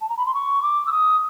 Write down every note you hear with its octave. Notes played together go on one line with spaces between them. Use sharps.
A5
A#5
B5
C6
C#6
D6
E6
D#6